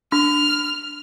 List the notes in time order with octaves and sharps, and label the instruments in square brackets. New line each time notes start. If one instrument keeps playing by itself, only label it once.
[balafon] D4 [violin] F6